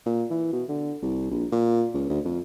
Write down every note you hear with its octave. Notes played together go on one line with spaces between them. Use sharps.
A#2
E3
B2
D3
C2
A#1
A#2
C#2
D2
F2